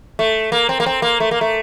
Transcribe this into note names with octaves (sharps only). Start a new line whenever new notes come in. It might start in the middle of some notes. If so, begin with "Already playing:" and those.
A3
A#3
C4
A#3
C4
A#3
A3
A#3
A3